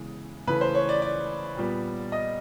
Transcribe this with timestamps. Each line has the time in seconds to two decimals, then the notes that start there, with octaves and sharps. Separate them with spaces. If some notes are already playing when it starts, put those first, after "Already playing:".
Already playing: C#3 E3 G#3 B3
0.47 C#3 E3 A3 B4
0.61 C5
0.75 C#5
0.89 D5
1.02 D5
1.57 A#2 G3 B3
2.12 D#5